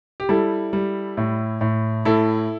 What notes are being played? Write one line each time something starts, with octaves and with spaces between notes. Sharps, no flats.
G4
G3 E4 A4
G3
A2
A2
A2 E4 A4